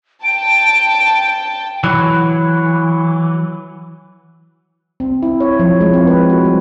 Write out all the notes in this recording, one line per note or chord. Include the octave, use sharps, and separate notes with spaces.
G5 A5 D7
E3 F#3
C4
E4
C#5
F3
G#3
C4
B4
F#4
G3